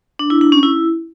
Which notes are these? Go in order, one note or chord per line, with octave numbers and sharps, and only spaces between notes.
D4
E4
D4
C#4
E4